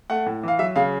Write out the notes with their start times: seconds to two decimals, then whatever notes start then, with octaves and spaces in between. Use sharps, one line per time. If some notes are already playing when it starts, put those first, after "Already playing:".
0.10 A3 F#5
0.26 A2
0.43 E3 F5
0.59 F#3 E5
0.76 C#3 F5